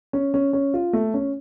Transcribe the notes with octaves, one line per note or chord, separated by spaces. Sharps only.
C#4
C#4
C#4
F4
A3
C#4